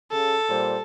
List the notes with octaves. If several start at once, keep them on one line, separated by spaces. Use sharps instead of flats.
C#3 A4
A#2 G3 C5